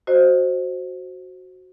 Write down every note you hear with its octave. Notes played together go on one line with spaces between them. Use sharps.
F#4 C5 D#5